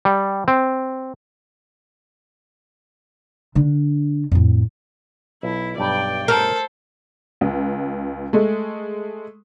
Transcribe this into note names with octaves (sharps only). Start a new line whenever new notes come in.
G3
C4
D3 D4
F2 A2
B1 E4
B1 G2 D5 G5
A4 A#4 C5
C#2
G#3 A3